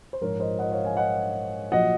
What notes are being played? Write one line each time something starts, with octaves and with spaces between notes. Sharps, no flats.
C5
A#1 G#2 F3 A#4 C#5
C5 D#5
D#5 F#5
C#5 F5
F5 G#5
D#5 F#5
A#1 A#2 F#3 D#5 F#5